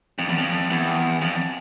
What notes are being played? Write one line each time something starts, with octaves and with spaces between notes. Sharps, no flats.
F2
E2
F2
E2
F2